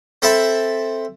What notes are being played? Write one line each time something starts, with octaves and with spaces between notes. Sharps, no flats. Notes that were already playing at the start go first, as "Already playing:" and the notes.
C4 A4 C5 E5 A5 B5